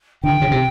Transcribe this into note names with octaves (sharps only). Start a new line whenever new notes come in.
D3 G5
C#3
C3